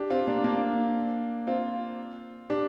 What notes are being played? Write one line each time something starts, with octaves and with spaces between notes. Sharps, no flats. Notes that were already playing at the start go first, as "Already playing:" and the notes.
Already playing: D4 G4
C4 F4
A#3 D4
A#3 D4
C4 F4
D4 G4